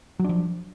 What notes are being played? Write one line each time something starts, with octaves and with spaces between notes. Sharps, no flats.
F3 F#3 D4